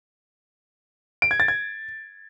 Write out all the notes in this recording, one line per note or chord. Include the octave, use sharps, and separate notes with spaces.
D7
G#6
A6
G#6